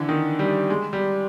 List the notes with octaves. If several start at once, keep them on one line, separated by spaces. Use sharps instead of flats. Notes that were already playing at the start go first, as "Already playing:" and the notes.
Already playing: D3 E3
D#3
G3
G#3
G3